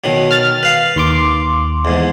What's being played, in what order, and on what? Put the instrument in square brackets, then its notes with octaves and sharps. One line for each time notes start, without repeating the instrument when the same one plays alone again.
[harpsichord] B2 D#3 F#3
[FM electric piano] F6 A6
[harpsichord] B4 F5
[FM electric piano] D#2 C6 D6
[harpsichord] E2 G#2